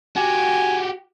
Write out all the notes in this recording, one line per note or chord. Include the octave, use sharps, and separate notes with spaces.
F#4 G4 G#5